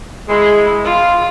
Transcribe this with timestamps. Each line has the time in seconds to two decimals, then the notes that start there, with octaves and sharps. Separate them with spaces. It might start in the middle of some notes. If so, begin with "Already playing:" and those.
0.29 G#3 E4
0.85 F4